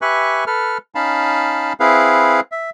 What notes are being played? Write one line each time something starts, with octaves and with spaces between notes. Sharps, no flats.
G4 B4 E5 G#5 C#6 F#6
A4 B4 F6
C#4 D#4 F5 A5 B5
C4 E4 G#4 B4 F5
E5